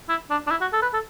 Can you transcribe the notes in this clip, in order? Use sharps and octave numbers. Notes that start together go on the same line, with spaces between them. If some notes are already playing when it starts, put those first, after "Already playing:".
E4
D4
D4
E4
F#4
A4
B4
A4